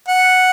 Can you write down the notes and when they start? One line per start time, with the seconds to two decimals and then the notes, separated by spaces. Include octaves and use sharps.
0.08 F#5